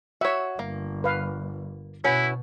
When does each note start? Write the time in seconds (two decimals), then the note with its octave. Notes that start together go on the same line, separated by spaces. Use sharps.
0.21 F#4 C#5 E5
0.59 G1 A#3
1.04 B4 F5
2.04 B2 C#4 E4 F#4 B4